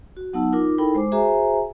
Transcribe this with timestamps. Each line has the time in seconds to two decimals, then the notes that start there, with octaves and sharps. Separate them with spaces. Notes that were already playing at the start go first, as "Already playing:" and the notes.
0.17 F#4
0.33 F#3 B3 D#4 F#5 A5 E6
0.53 D#4 F4 A#4 D6
0.78 D#4 E4 A4 A#4 G5 B5
0.95 G#3 C5 D6
1.12 F#4 G#4 C5 E5 G#5 A#5